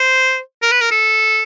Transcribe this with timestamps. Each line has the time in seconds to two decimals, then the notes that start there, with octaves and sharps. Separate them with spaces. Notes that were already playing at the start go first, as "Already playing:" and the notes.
Already playing: C5
0.62 A#4
0.71 B4
0.81 A#4
0.91 A4